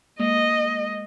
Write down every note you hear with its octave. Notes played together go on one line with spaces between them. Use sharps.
G#3 A#3 D#5